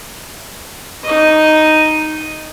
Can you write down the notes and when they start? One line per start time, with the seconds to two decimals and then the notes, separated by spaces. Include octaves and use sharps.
1.04 D#4 D#5